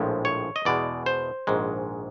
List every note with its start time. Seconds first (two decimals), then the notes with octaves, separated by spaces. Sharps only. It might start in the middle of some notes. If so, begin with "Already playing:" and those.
Already playing: A#1 A2 F3 G#3
0.25 C#5
0.56 D#5
0.65 E2 B2 G#3 D5
1.06 C5
1.47 A#1 G#2 D#3 G#3